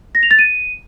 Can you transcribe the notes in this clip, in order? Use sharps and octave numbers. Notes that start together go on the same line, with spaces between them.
A#6
F7
A6
D#7